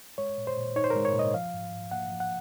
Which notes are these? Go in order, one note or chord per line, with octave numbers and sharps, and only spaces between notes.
G#3 C#5
A#2
C5
A#2
D#4 C#5
C5
G#3 A#4
C#5
A#2 D#5
F3 F5
G#2
G#2
A#3 F#5
F3
F#5